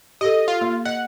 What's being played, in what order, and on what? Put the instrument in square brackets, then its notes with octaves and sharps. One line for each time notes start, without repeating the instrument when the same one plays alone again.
[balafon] G4 A4 [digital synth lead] D#5
[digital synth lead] F4
[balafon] A#3
[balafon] D#5 [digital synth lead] F#5